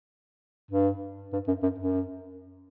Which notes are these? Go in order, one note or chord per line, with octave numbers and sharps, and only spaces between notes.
G2
G2
F#2
F#2
F#2